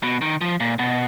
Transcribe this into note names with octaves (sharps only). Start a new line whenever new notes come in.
B2
D#3
F3
A#2
B2